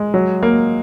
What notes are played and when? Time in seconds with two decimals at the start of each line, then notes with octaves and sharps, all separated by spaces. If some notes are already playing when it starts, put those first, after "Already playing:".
Already playing: G#3
0.14 F#3
0.43 A#3